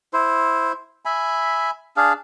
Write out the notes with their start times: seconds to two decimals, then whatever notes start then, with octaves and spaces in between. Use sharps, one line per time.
0.13 E4 C5
1.05 E5 G#5 B5
1.97 D4 G#4 F5